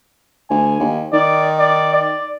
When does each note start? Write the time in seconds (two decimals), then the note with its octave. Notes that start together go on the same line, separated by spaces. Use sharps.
0.50 D2 G#5
0.79 D#2
1.13 D#3 D5
1.59 D5
1.94 D5